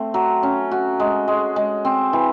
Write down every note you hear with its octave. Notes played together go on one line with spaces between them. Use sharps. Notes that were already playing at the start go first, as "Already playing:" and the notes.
Already playing: A3 C4
F#3
C#4
F#4
G#3
G#3
G#3
C4
E3